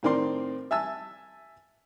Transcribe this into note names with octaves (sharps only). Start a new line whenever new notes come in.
A2 D#3 C4 A#4 D5 C6
E5 G#5 A5 E6